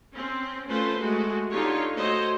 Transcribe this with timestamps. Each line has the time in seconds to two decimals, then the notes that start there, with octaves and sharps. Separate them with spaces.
0.13 C4 C#4
0.69 A3 C#4 F4 A4 B4 C5
0.99 G#3 A3 F#4
1.50 D3 D#4 F4 G4 C#5
1.96 A3 F#4 C5 C#5 D#5